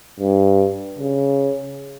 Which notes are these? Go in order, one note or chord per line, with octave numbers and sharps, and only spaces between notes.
G2
C#3